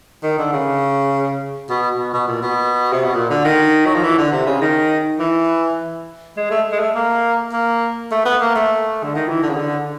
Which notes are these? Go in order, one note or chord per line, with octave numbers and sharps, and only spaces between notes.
D#3
D3
C#3
B2
B2
B2
A#2
B2
C3
B2
A#2
D3
D#3
F#3
F3
E3
D3
C3
C#3
D#3
E3
G#3
A3
G#3
A3
A#3
A#3
A3
B3
A#3
A3
D3
D#3
E3
D3
C#3
D3